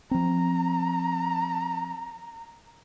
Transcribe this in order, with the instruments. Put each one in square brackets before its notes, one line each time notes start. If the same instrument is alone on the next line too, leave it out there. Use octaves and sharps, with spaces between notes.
[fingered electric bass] F3 C4 [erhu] A#5